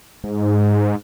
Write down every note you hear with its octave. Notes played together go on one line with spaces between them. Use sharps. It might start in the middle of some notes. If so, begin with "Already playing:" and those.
G#2